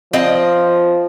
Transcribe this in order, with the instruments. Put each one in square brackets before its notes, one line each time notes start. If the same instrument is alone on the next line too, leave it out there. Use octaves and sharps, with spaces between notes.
[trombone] F3 [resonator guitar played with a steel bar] C4 D#5